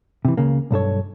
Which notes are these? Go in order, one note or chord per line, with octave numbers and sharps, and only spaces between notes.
C3 E3
C#2 C#3 A#3
B1 G2 A4 C#5